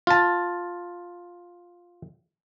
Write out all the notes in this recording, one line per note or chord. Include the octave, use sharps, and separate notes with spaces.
F4 A5